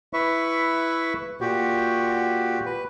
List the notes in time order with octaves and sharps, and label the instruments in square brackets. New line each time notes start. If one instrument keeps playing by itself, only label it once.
[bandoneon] E4 B4 E5 C#6
A#2 F#4 G4
B4